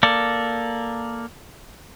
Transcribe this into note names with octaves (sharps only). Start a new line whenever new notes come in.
A#3 A4 D5